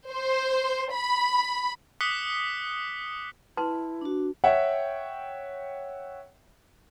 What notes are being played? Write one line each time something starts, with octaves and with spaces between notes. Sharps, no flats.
C5
B5
D6 D#6 F#6 B6 C#7 G7
E4 B4 A5 C6
D4 F#4
C#5 E5 F#5 G5